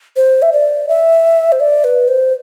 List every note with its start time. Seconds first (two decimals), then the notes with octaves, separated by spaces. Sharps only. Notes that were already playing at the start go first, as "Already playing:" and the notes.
0.16 C5
0.42 E5
0.53 D5
0.89 E5
1.52 C5
1.60 D5
1.84 B4
2.08 C5